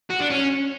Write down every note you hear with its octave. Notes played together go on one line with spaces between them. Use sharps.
F#4
D4
C#4